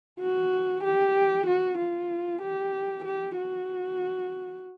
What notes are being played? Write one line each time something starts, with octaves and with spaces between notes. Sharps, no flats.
F#4
G4
F#4
F4
G4
G4
F#4